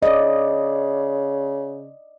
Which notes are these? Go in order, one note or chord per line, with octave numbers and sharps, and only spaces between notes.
C#3 D5 D#5